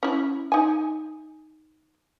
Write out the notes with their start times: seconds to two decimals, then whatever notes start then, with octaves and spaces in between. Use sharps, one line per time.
0.03 C#4 E4
0.52 D#4 G#5